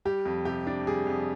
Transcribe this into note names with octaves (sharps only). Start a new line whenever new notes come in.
G3 G4
F2
C3 G4
D4
G3 G#4
F2